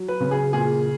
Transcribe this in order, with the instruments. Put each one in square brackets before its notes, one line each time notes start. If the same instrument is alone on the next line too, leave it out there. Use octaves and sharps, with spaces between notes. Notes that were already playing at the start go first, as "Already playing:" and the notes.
Already playing: [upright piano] F#3
B4
C#3
G#4
A#2 G#4